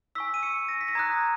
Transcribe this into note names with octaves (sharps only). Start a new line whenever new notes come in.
G#5 C#6 E6 B6
D#7
C#7
A#6
B6
A#6
A#5 D#6 F#6 G#6